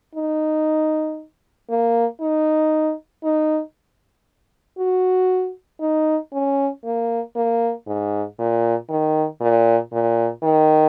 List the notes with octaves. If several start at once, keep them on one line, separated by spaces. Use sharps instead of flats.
D#4
A#3
D#4
D#4
F#4
D#4
C#4
A#3
A#3
G#2
A#2
D#3
A#2
A#2
D#3